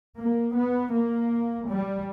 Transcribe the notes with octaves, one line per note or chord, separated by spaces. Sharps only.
A#3
B3
A#3
G3